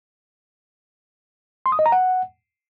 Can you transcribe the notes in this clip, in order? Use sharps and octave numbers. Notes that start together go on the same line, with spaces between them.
C6
D#6
D#5
A#5
F#5